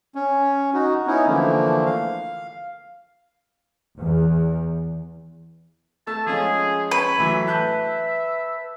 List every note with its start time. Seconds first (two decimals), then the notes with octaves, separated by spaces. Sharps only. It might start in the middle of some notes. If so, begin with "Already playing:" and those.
0.15 C#4
0.74 D#4 F#4
1.07 B3 C#4 D#4 E4
1.27 D3 E3 F3 A3 A#3
1.86 F5
3.99 E2
6.07 A3 A5 E6
6.27 F3 G#3 C#4 G#4
6.91 B4 C#5
7.18 A2 E3 F#3 E5
7.47 A5 F#6 G6